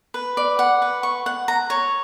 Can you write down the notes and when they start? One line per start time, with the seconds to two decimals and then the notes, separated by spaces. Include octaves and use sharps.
0.14 B4
0.37 D5
0.59 F#5
0.82 B4
1.03 C#6
1.26 F#5
1.48 A#5
1.70 C#5